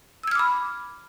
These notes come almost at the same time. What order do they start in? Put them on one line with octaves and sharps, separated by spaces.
E6 G#6 F6 D6 B5